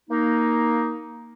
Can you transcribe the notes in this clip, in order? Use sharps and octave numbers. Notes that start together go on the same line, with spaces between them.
A#3 D#4